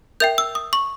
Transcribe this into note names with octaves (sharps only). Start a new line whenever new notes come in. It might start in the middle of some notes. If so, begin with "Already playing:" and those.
A#4 E5 G5 G6
E6
D#6
C#6